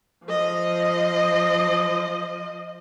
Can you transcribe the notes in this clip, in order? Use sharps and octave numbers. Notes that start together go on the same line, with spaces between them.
F3 D#5